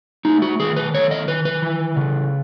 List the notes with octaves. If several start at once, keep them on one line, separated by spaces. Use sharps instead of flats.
A3 D#4
F#4
D#3 G#4
B4
A3 C#5
D#5
D#3 B4
B4
E3
C#3